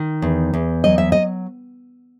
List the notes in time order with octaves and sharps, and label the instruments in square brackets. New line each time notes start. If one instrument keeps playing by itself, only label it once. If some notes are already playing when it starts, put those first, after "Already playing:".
Already playing: [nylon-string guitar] D#3
E2
E2
F#3 D#5
E5
D#5